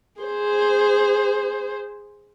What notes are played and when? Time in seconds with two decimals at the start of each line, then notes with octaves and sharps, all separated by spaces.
0.21 G#4 C5